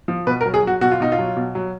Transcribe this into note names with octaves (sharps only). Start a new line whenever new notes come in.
F3
B2 B4
A#4
F#3
G#4
F#3 F#4
B2 F#4
F4
B2 D#4
F4
F#3
B2
F#3